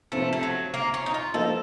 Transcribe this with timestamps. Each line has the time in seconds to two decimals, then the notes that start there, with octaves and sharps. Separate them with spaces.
0.12 C3 F3 A3 C4
0.33 A3
0.43 F#3
0.74 A#3
0.94 C#4
1.06 D#4
1.14 F4
1.34 F3 A#3 F4 A4 C5 D#5